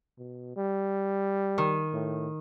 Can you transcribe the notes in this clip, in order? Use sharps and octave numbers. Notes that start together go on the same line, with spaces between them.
B2
G3
D#3
A2